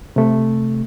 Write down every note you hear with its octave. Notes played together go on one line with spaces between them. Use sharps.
C3 A3